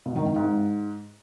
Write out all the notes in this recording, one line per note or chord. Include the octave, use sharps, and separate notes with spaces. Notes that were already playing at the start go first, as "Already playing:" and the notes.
B2
D#3
D#3
G#2